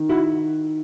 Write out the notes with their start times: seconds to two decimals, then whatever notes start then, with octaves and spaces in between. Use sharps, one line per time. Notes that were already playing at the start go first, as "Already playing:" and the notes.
Already playing: D#3
0.09 E4 F#4